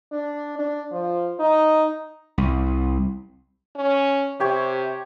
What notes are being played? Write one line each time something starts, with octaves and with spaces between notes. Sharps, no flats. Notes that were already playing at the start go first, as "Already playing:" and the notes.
D4
D4
F3
D#4
C2
C#4
C3 G4 C#5